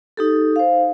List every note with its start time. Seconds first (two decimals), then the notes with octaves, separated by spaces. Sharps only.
0.17 D#4 G4 A4
0.56 C5 F5